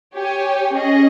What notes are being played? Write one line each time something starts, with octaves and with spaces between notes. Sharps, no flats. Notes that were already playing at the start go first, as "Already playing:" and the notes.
G4 C#5 G#5
C#4 G#4 D#5